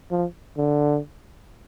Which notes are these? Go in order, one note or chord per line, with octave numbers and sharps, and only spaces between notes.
F3
D3